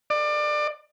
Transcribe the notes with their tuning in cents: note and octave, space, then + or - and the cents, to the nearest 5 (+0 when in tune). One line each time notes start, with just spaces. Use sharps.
D5 +25